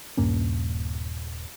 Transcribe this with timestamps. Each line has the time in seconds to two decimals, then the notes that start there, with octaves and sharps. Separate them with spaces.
0.17 D#1 G2 A#3 C#4